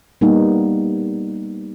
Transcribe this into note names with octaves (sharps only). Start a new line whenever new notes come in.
G3 A#3 B3 D#4